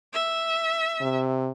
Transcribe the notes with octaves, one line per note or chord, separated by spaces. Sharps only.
E5
C3